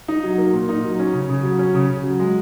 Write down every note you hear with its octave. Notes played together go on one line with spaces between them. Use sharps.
D#4
F#3
A#3
A#2
D#4
F#3
C#4
C#3
C#3
F#3
C#4
C#3
C#3
F#3
G#3